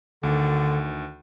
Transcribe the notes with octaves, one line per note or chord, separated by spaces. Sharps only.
D2 D3 D#3